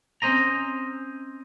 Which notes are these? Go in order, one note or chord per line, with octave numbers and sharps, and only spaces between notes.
C4 C#4 C5 D#5 A#5